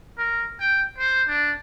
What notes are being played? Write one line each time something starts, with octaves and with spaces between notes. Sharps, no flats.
A#4
G5
C5
D4